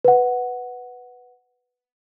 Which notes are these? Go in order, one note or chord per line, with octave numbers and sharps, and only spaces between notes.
B4 F#5